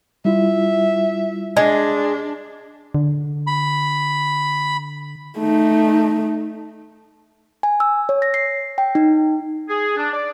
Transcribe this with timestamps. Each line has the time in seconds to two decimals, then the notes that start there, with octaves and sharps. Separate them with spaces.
0.25 G3 E4 F4 E5
1.57 G#3 D4
2.95 D3
3.47 B5
5.38 A3 D#4
7.63 G#5
7.80 E6
8.09 C#5
8.22 A#6
8.34 C7
8.78 G5
8.95 D#4
9.69 G#4
9.97 D4
10.13 D5